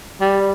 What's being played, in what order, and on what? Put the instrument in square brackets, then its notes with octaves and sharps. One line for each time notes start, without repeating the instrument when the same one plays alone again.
[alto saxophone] G3